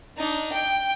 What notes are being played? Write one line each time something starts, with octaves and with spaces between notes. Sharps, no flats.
D4 D#4
G5